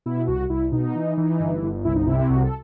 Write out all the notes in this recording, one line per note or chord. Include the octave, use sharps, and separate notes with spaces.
B2 E4
C2 F#4
C2 E4
B2 D#4
E3
E3
G1
G1
C2 E4
D#4
C3 E4
E4
C2 F#4
A4